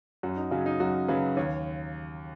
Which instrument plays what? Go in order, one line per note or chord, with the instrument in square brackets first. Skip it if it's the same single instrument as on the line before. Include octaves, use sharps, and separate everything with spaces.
[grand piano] F#2 F#4
D#4
C#3 F#3 C#4
D#4
F#2 F#4
C#3 F#3 B4
D#2 C#5